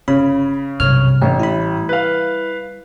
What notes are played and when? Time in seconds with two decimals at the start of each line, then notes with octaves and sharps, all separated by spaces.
0.08 G1 C#3 B5
0.80 B1 G2 C3 C#5 F6
1.22 A1 A3 D4
1.40 G3 E4 B5
1.89 B4 F5